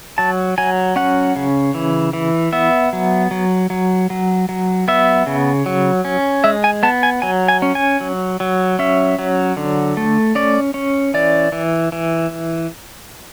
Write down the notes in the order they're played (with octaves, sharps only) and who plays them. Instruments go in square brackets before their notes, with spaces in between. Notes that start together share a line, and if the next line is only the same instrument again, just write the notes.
[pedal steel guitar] F#3 A5
F#3 G#5
C#4 F#5
C#3
E3
E3
B3 E5
F#3
F#3
F#3
F#3
F#3
B3 E5
C#3
F#3
C#4
G#3 E5
G#5
B3 A5
G#5
F#3 G#5
G#5
C#4
G#5
F#3
F#3
C#4 E5
F#3
D3
A3
C#4 D5
C#4
E3 D5
E3
E3